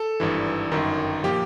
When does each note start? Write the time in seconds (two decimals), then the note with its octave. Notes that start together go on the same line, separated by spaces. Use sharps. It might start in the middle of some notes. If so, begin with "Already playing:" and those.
Already playing: A4
0.20 G#1 G2 E3
0.72 G1 F#2 D#3
1.24 A#2 F3 G4